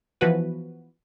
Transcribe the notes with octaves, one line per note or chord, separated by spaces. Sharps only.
E3 F3 B3 F#4 B4